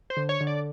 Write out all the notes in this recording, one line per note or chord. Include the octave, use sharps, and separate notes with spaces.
C5
D3
C#5
D3
D5